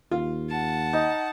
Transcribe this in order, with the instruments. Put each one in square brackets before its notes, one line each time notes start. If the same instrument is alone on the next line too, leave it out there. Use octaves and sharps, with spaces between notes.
[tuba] D#2 [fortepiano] F4
[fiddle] F#5 A5
[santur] D#4